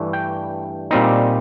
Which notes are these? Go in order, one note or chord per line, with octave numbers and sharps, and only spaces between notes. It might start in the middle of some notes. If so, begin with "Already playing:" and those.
Already playing: G2 E3 A3 D4
G5
A#2 G3 C4 D#4